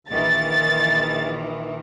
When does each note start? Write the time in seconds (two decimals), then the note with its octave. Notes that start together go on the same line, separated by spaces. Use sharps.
0.10 A#1 D#3 E3 A6